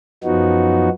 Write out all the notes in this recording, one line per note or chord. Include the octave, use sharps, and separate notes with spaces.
F#2 F3 F#3 B3 D#4 F#4